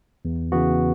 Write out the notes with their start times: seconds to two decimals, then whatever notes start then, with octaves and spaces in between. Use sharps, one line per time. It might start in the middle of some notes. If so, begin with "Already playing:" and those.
0.25 E2
0.52 C#3 E3 B3 F#4